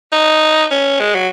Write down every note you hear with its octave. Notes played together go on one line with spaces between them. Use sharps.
D#4
C#4
G#3
F#3